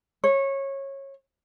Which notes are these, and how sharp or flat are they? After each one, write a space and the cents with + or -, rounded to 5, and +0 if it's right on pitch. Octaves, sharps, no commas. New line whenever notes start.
C#5 -20